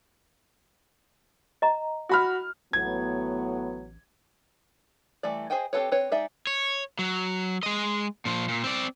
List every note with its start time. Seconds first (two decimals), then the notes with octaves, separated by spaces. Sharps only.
1.62 D#5 A#5
2.09 F#4 B5 F6
2.73 A1 A2 F#3 B3 G#6
5.23 E3 G3 A3 D5
5.50 G#4 C5 D#5 G5 G#5
5.73 C4 G4 A4 B4 C#5
5.92 C4 B4 C#5
6.12 G#3 D#4 D5 E5
6.47 C#5
6.99 F#3
7.63 G#3 D#5
8.25 A#2 F3
8.48 A#2
8.64 C4 D5